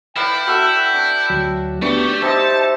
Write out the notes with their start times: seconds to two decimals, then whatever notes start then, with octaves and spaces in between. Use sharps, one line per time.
0.16 E4 B4 D5 F5 G5
0.47 F#4 A4 E5
0.93 D4
1.30 D2 F#3
1.82 A3 B3 D4 G4 C#6
2.23 G3 D#4 C5 E5 A5